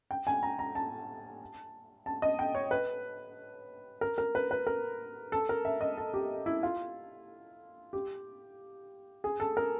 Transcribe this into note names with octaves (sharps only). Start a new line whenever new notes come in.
G5
G#5
A#5
A#5
A5
A5
D#5
G5
C#5
B4
A#4
A#4
B4
B4
A#4
A4
A#4
E5
D#5
A4
G4
E4
F4
G4
G#4
A4
A#4